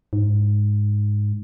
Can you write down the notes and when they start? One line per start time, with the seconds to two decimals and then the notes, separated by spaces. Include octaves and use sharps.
0.13 G#2